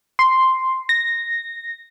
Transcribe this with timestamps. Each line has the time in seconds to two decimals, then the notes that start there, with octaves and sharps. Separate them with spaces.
0.19 C6
0.89 A#6